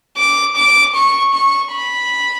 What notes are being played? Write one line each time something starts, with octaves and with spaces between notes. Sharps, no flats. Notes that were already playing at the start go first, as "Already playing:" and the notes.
D6
D6
C#6
C#6
B5